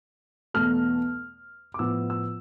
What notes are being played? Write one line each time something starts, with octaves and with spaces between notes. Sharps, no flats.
E2 B2 A3 F6
D6
A2 F3 B3 E6
E6